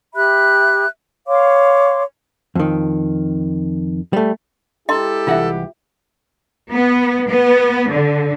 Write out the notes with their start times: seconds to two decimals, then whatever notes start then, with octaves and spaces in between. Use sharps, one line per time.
0.16 G4 E5 B5 F#6
1.27 C#5 F5 C6 D6
2.55 F2 D#3
4.13 G3 A3
4.89 G#3 E4 G4 A4 D#5 A#5 C6
5.27 C2 E3 F4 E5 F#5
6.71 B3
7.29 B3
7.90 D3